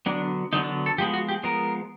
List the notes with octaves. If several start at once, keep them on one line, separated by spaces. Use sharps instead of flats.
D3 F#3 B3 D4
D3 F#3 B3 D#4
D4
A4
F3 G#3 B3 G4
F#4
G4
F3 G#3 B3 A#4